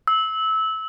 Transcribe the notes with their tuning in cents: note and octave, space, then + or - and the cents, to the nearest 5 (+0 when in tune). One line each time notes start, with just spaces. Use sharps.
E6 -20